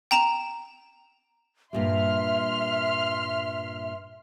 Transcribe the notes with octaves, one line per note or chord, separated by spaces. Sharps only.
G5 A#5 E7
G2 A#2 G3 E5 C6 F6